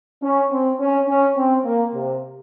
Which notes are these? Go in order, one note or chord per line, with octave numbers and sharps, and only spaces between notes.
C#4
C4
C#4
C#4
C4
A#3
C3